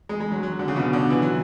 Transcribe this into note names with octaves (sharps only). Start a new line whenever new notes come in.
G#3
G#3
F#3
F#3
D3
C#3
B2
D3
E3
F#3